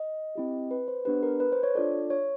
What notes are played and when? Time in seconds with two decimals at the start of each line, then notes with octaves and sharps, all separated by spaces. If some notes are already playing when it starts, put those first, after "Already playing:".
Already playing: D#5
0.35 C4 E4 G4
0.71 B4
0.88 C5
1.05 B3 D4 G4 B4
1.23 A#4
1.40 B4
1.52 C5
1.63 C#5
1.75 D4 F4 A4 D5
2.10 C#5